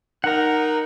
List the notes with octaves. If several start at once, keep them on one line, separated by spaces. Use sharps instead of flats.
D#4 A#4 F#5 A#5